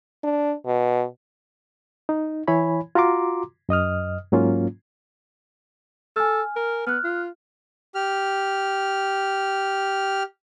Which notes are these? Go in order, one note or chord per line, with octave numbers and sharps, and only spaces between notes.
D4
B2
D#4
E3 E4 C#5 G#5 B5
F4 F#4 A#5 C6 D6
F#2 D#5 D#6 F6
G#2 F#3 A#3 C#4 F4
A4 G#5 F6
A#4
B3 F6 F#6
F4
G4 F6